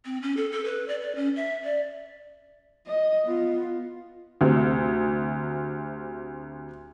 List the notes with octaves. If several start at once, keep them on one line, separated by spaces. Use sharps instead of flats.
C4
C#4
A4
A4
B4
D5
D5
C#4
E5
D5
D#5
B3 F4
D2 C3